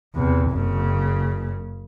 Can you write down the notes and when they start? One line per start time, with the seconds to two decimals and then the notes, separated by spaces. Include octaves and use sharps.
0.15 E2 C3
0.50 F#1 C#3